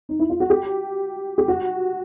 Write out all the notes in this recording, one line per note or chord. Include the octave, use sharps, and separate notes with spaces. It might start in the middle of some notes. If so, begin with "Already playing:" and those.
D#4
E4
F4
F#4
G4
G4
F#4